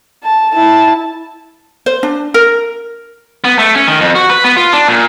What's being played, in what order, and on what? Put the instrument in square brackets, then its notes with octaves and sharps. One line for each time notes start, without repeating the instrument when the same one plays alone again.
[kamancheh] A5
E4 A5
[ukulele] C5
D4
A#4
[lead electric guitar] B3
A3
C#4
D#3
F2
F#4
B4
B3
F4
D4
A#2